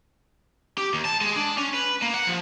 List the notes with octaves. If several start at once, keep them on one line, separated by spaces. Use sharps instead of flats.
G4
D#2
A5
G#3
D4
C#4
B4
A#3
F#5
F3